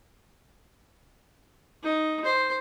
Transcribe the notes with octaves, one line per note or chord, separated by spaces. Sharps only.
D#4
C5